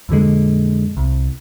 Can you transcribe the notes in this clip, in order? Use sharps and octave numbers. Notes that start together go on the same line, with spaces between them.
F2 A#2 D3 G#3
C2